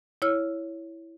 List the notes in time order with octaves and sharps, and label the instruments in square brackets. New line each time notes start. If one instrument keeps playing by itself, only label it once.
[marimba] E4 C#5 E6 F6